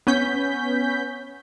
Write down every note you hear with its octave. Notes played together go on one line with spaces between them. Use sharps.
B3 C#4 G6 B6